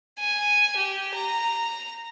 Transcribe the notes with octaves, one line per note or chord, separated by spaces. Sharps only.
G#5
G4
A#5